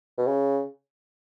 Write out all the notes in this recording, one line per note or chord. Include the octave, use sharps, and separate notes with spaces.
B2
C#3